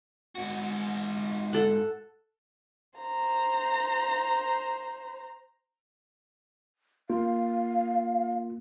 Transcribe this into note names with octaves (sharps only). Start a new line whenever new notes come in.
G#2 F#4
A4 F#5
C5 A#5
A#3 F4 F5